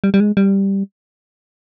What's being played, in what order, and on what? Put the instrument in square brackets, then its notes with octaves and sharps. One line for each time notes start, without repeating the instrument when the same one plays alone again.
[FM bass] G3
G3
G#3
G3